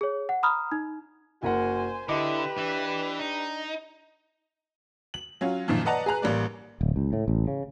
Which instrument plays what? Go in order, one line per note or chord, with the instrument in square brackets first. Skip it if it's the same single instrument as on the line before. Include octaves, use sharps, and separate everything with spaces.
[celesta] G#4 C#5
F#5
A#5 B5 D#6 F6
D#4
[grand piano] F#1 A#4 F#5 [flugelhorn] F#4 [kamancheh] C5 G#5
[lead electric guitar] D3 [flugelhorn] E4 [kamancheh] G4 B4 [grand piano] D#5 D6
[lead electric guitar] E3 [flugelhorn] D4
[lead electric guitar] D#4
[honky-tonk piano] F#7
F#3 C#4 F4
F#2 A#2 D#3 F3
B4 D5 D#5 F#5 A5 A#5
G#4 B4 A#5 F#6
A1 G3 A#3 D5
[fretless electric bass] D1
C#2
A2
A1
C#3